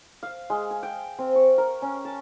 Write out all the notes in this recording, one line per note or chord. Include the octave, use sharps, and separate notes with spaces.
F5
G#3
G#5
G5
C4
C#6
A#4
C#4
A5